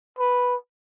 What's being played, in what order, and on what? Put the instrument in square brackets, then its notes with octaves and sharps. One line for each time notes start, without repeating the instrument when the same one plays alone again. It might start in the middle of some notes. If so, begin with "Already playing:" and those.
[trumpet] B4